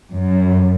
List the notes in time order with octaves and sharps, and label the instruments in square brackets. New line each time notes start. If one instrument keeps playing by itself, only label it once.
[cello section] F#2